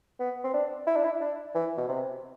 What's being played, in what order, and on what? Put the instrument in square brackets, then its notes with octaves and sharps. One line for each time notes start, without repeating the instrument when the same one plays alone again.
[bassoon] B3
C4
D4
E4
D4
E4
D4
E3
B2
C3